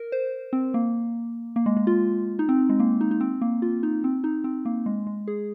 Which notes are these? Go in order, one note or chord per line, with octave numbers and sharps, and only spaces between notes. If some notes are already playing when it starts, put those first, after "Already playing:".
Already playing: A#4
C5
C4
A#3
A#3
G#3
G#3
F4
D#4
C4
G#3
A#3
D#4
D#4
C4
A#3
F4
D#4
C4
D#4
C4
A#3
G#3
G#3
G#4